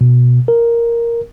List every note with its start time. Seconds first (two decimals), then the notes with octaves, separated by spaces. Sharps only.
0.01 B2
0.48 A#4